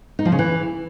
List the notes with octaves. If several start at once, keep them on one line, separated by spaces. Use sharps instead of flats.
D#4
F3
C#3
E3